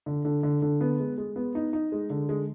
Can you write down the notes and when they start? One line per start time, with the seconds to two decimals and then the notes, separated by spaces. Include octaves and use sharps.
0.06 D3
0.25 D3
0.43 D3
0.62 D3
0.81 B3
1.00 G#3
1.18 G#3
1.36 B3
1.55 D#4
1.73 D#4
1.92 G#3
2.10 D3
2.29 G#3